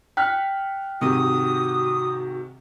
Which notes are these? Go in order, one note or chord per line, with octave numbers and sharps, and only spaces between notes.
G5 F6 F#6 B6
G#2 C3 D#3 F#4 D#6